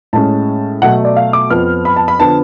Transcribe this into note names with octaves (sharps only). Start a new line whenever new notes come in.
A2 G#3 C#4 A5
B2 F#3 A3 F#5
D5
F5
D6
F2 F3 B3 F6
B5
A5
B5
D3 F3 B3 D4 A5